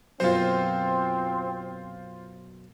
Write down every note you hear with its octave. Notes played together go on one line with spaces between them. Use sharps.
F#2 B2 F#3 C4 F4 C5